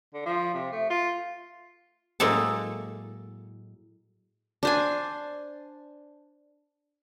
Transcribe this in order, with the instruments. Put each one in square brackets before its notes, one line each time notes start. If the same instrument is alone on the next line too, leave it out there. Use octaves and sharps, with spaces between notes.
[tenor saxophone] D3
F3
C3
A3
F4
[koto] A2 F#3 G#3 A#3 A4
[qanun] D4 C5 G#5